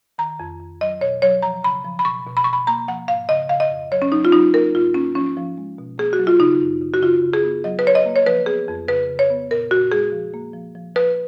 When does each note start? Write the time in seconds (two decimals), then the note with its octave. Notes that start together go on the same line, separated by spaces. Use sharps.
0.18 D#3 A#5
0.40 F2
0.61 F2
0.81 F#3 D#5
1.01 B2 C#5
1.22 F#3 C#5
1.42 F3 A#5
1.63 C#3 B5
1.85 F3
1.99 B5
2.05 B2 C#6
2.26 B2
2.37 B5
2.44 B2 C#6
2.53 B5
2.67 A#3 A#5
2.88 F3 F#5
3.08 G#2 F5
3.29 C#3 D#5
3.49 C#3 F5
3.60 D#5
3.70 F2
3.92 F#3 C#5
4.02 C#4
4.12 F#3 D#4
4.25 F4
4.32 F#3 D#4
4.54 A#3 A#4
4.75 G#2 F4
4.94 A#3 C#4
5.15 F3 C#4
5.37 F3
5.58 G#3
5.78 B2
5.98 A#3 G#4
6.13 F#4
6.19 F#3
6.27 F4
6.39 C#3 D#4
6.60 F#2
6.81 C#3
6.94 F#4
7.01 C#3 F4
7.22 C#3
7.33 G#4
7.44 B3
7.64 F#3 D#5
7.79 B4
7.85 F#3 C#5
7.95 D#5
8.06 A#3
8.16 C#5
8.26 F3 B4
8.46 B3 G#4
8.68 F2
8.88 C#3 B4
9.09 C#3
9.19 C#5
9.30 B3
9.51 A#2 A#4
9.71 A#2 F#4
9.92 G#3 G#4
10.12 F3
10.34 A#3
10.53 F3
10.75 F3
10.95 F3 B4